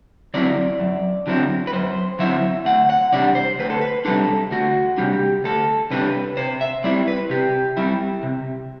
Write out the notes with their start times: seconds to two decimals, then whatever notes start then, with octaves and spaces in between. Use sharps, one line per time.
0.34 D3 F#3 C4 E4 D5
0.80 F#2
1.27 D3 F#3 C4 E4
1.67 B4
1.73 F#2 C5
2.19 D3 F#3 C4 E4 E5
2.65 D2 F#5
2.90 F#5
3.12 C3 G3 D4 D5
3.35 C5
3.59 D2 B4
3.70 A4
3.81 B4
4.05 C3 G3 D4 A4
4.51 D2 F#4
4.98 C3 G3 D4 G4
5.44 D2 A4
5.91 C3 G3 D4 B4
6.37 C3 C5
6.61 E5
6.84 G3 C4 E4 D5
7.08 B4
7.30 C3 G4
7.77 G3 C4 E4
8.23 C3